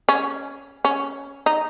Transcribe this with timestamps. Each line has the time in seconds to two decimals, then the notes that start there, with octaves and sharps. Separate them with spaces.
0.09 C#4
0.85 C#4
1.46 D#4